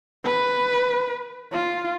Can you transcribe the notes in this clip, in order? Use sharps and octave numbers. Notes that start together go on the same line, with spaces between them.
B4
F4